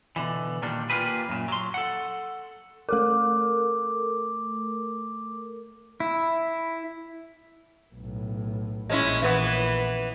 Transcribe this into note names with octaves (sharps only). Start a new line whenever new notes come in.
B2 D3 E3
A#2 D#3 G3 D4
A#3 F4 G4 G#4 B4
F#2 A#2
F#3 C6
A4 F#5
A3 A4 A#4 D6
E4
B1 A2
A#1 G#3 C#4 E4
E3 B3